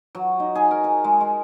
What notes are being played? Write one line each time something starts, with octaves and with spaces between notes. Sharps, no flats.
F#3
D#4
G#4
A#4
G#4
G#3
G#3